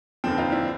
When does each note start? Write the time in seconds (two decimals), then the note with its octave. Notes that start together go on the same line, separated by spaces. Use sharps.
0.24 F1 D#2 D3 F3 C4
0.38 D#4 F4
0.52 D4 E4